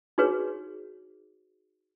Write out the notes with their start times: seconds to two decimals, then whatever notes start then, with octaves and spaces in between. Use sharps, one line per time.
0.18 D#4 F#4 G#4 B4 C#5